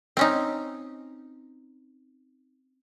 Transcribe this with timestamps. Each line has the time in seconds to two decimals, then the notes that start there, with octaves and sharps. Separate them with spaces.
0.17 C4 C#4 D#4